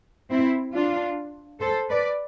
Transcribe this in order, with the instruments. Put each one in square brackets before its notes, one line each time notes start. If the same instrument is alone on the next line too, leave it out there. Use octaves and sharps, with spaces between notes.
[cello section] C4 E4
D4 F4
A4 C5
B4 D5